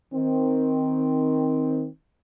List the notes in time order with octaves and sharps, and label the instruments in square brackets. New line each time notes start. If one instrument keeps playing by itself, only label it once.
[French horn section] D#3 C4